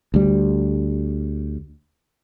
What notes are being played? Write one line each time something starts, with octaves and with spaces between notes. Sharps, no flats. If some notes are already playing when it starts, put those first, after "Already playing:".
D2 G3